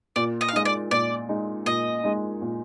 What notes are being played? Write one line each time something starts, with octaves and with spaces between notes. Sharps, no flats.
A#2 D5
D#5
F5
G#3 D#4 D#5
D5
A#2 D5
G#3 D#4
A#2 D#5
G#3 D#4
A#2